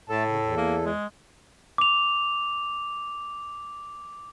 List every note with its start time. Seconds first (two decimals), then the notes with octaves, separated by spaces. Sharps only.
0.10 A2 A3 A4 A5
0.27 C#3
0.39 E2
0.57 A#3
0.85 G#3
1.78 D6 F7